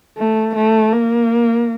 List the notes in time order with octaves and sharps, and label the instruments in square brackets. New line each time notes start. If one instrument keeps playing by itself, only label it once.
[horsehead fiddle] A3
A3
A#3